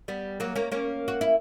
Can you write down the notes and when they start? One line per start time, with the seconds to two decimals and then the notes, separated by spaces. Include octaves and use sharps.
0.08 G3 B3
0.40 F#3 A#3
0.55 A#3 C#4
0.72 A#3 C#4
1.08 F#4
1.21 E4